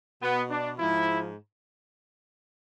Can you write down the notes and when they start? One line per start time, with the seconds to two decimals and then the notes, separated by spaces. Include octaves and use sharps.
0.22 B2 B3
0.50 D4
0.78 G#2 F3 E4